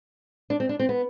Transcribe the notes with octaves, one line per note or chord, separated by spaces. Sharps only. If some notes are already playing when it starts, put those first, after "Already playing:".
D4
C4
D4
C4
B3